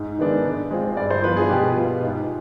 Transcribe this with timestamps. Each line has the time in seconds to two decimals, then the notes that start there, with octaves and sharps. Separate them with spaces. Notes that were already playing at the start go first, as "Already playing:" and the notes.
Already playing: G#2
0.18 D#3 G#3 B3 D4
0.45 D3
0.71 G#3 C4 F4
0.97 G2 D5
1.10 C5
1.24 F3 B3 F4 B4
1.36 G#4
1.50 B2 G4
1.76 B3 F4
2.03 G#2